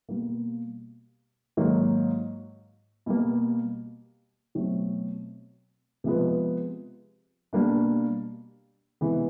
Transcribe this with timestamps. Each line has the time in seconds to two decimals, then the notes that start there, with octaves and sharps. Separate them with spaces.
0.09 B2 G3 A#3
1.57 G#2 D#3 F#3 A#3
3.06 B2 G3 A#3
4.55 B2 F#3 A3 C4
6.04 C3 F3 G#3 B3
7.53 B2 G3 A#3 D4
9.01 C3 E3 G#3 B3